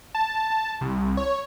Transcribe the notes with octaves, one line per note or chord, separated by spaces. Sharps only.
A5
C2
C#5